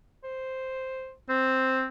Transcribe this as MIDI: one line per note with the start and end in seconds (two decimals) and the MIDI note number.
0.24 1.12 72
1.29 1.86 60
1.29 1.81 72